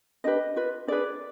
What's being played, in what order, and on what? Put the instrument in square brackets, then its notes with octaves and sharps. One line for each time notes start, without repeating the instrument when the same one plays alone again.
[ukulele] D4 G4 B4 D#5
F4 B4
D4 G#4 B4 D5